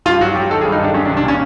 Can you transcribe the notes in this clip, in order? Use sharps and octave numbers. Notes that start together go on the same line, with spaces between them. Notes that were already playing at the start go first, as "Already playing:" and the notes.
G2 F4
F#3 F#4
F#3 G4
D#3 A4
G#4
G2
D#4
D#3 D4
F#3 C#4
D4
C2
D4
A#2 C#4